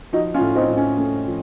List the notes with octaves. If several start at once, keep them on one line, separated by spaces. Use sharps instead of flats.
F3 D#4 F#4
C#4 F4
A2
C4 D#4
A2
C#4
A3 C#4
F3